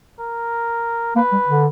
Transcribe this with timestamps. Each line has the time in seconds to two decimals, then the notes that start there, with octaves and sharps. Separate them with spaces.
0.20 A#4
1.16 A#3 B4
1.32 G3
1.48 D3